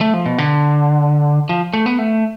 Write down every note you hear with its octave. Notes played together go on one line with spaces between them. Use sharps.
A3
F3
B2
D3
F3
A3
B3
A3